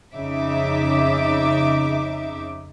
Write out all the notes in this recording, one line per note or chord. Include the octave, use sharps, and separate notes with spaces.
F2 C#3 D#4 E5 D6